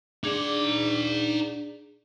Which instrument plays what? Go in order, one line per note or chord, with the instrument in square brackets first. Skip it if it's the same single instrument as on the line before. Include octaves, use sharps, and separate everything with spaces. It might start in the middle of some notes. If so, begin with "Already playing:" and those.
[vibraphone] D4 G#4 D5 [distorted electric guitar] D#4 F#5